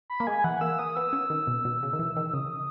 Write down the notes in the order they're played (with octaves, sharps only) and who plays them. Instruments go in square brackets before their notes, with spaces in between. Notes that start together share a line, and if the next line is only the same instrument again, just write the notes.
[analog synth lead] B5
[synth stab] A#3
[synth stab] G#3 [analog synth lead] G#5
[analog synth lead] G#5
[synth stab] E3 [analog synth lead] F#5
[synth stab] A#3 [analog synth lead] E6
[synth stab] A#3 [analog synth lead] D#6
[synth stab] B3 [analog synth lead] E6
[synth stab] C#4
D#3
B2
B2
C#3
D#3
E3
D#3
[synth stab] C#3 [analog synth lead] D#6